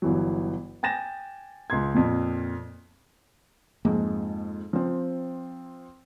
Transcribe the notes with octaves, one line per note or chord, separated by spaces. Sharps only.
G1 E3 F#3
G5 G#5 A6 A#6 E7
C#2 C6 G#6
F2 A#2
F2 G#2 A#3
F3 C4